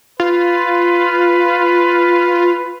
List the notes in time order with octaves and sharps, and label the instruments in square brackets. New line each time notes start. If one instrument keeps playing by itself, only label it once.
[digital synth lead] F4 [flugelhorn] B4